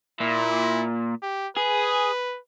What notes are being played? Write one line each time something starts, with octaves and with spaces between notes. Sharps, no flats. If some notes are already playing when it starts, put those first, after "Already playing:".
A#2 E4
G4
G#4 B4